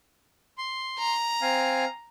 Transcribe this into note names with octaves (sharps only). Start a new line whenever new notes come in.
C6
A#5
C4 F5 G#5